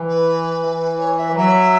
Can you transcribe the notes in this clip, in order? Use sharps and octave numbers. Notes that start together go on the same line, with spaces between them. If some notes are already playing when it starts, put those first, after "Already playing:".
Already playing: E3
B4
E3
C#5
E5
E3
F#3 E5